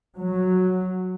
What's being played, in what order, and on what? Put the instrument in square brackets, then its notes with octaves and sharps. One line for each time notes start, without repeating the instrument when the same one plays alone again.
[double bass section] F#3